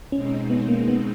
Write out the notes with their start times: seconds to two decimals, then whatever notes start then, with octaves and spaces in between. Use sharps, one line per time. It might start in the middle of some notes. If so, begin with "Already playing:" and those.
0.12 B2 G#3 C4 C#4 D#4
0.50 B3
0.68 A#3
0.88 B3